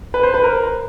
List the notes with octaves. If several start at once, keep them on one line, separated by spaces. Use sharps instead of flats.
B4
C5
B4
A#4